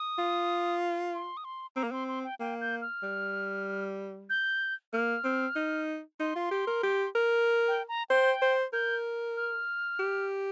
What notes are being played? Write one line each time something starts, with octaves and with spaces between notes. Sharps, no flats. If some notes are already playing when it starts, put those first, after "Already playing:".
Already playing: D#6
F4
C6
D#6
C6
C4 A#5
A#3
C4 C6
C6
G5
A#3 G5
G6
F6
G3
G6
A#3 F6
C4
D#4
D#4 C6
F4
G4
A#4
G4
A#4
G5
A#5
C5 G5
C5
A#4 G6
F6
G4